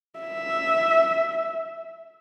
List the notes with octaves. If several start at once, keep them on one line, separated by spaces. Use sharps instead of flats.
E5